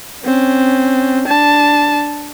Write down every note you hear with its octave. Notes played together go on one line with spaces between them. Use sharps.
C4 C#4
D4 A5